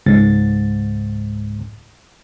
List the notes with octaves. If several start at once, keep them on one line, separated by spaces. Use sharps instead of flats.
C#2 G#2 A6